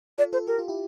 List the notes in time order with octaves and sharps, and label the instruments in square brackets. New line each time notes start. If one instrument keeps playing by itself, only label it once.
[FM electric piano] F4 A4 [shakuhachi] D5
[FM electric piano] F4 A4 [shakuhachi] C5
[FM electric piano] G4 [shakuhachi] A#4
[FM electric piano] F4
E4 G4